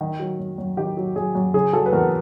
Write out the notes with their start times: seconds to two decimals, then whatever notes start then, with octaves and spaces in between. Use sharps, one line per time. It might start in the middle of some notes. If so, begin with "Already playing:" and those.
0.01 D#3
0.20 F#3
0.39 F#2
0.58 F#2
0.77 D#3 G4
0.97 F#3
1.16 F#2 G#4
1.35 F#2
1.54 C#3 G#4
1.73 F#3 A4
1.86 B4
1.93 E2 A#4